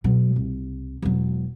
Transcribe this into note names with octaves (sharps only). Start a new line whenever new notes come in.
B2 F#3
C2
E1 F#3